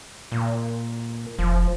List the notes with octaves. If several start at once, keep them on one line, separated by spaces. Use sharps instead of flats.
A#2
F1 F3